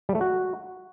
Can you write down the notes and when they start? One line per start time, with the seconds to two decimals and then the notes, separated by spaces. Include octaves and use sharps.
0.09 G3
0.15 A3
0.21 F#4